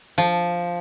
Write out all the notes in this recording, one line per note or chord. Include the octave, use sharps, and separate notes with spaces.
F3